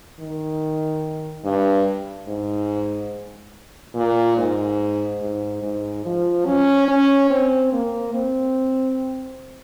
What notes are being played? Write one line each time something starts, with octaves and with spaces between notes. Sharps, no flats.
D#3
G2
G#2
A#2
G#2
G#2
G#2
F3
C#4
C#4
C4
A#3
C4